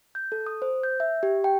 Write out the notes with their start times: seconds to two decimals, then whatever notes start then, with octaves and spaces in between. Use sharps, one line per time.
0.15 G6
0.32 A4
0.46 D#6
0.62 C5
0.83 G6
1.00 E5
1.23 G4
1.44 G5